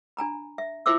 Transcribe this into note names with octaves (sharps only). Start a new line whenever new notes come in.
D4 G#5 A#5 B5
E5
E4 F4 C5 E5 D6 E6